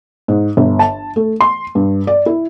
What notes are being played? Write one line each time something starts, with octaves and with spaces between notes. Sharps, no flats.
G#2
G1
A5
A3
C6
G2
D5
E4